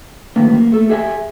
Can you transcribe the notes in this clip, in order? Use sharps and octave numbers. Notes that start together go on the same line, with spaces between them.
F#2 A2 D3 D#3 A#3 B3
A#3
A3 A4
G4 G#4 E5 F5 G#5